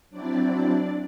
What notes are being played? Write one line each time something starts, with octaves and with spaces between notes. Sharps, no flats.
F#3 C4 D4 E4 D5